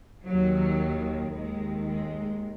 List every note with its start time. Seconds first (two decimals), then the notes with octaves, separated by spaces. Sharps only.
0.24 D#2 D#3 F#3
1.33 D#2 D#3 G#3
1.87 G#3